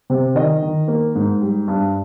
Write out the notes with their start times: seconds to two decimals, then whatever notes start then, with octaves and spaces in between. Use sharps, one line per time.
0.10 C3
0.35 D#3 D#5
0.62 D#3
0.88 A#3
1.15 G#2
1.41 G3
1.68 G2